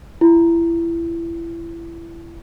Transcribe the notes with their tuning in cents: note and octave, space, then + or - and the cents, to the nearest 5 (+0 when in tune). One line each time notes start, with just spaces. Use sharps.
E4 +25